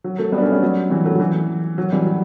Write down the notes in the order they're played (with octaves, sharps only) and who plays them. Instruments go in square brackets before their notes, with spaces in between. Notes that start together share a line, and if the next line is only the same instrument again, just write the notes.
[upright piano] F#3
F#3 A3
G3 B3
D4
A3 C#4
G3 B3
F#3
E3 G3
F#3 A3
F#3
E3
F#3
E3 G3
F#3